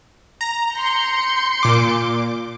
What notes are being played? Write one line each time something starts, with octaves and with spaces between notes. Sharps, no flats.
A#5
C6 G6 C#7
A#2 D6